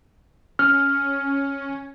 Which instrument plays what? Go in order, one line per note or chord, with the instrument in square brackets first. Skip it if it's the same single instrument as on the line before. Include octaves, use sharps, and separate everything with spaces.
[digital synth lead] C#4 [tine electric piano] F6